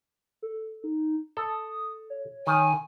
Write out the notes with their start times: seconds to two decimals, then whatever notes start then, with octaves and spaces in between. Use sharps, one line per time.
0.42 A4
0.84 D#4
1.37 A4 D#6
2.10 C#5
2.47 D#3 G#5